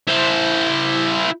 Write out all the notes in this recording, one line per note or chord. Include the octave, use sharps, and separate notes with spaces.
E4 C5